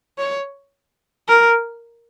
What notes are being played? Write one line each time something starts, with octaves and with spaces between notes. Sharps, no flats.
C#5
A#4